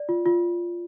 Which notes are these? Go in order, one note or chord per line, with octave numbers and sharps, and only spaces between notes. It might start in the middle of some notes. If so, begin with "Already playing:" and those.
Already playing: D5
F4
F4